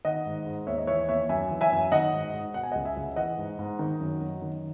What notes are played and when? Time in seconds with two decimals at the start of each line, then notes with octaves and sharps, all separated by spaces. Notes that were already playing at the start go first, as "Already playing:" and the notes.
0.05 D#3 D#5 F#5
0.26 G#2
0.46 G#2
0.67 D#2 C#5 E5
0.78 D#5
0.87 E3 C#5 E5
1.09 D#2 C#5 E5
1.29 F#2 E5 G#5
1.51 E3
1.61 E5 G#5
1.72 F#2
1.92 D#3 D#5 F#5
2.13 G#2
2.33 G#2
2.54 B2 F#5
2.63 G#5
2.71 C#2 D#5 F#5
2.85 E5 G#5
2.97 C#2
3.16 E3 D#5 F#5
3.38 G#2
3.59 G#2
3.79 D#3
4.00 F#2
4.21 F#2
4.42 D#3